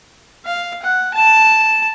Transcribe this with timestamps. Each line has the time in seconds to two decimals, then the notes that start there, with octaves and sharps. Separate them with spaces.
0.45 F5
0.82 F#5
1.14 A5